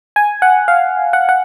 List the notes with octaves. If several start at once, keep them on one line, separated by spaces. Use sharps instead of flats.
G#5
F#5
F5
F#5
F#5